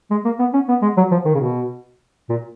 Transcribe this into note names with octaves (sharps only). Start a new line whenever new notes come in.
G#3
A#3
B3
C#4
B3
G#3
F#3
F3
D#3
C#3
B2
A#2